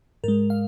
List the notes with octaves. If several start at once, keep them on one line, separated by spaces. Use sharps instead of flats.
G#2 G#3 A#4
F5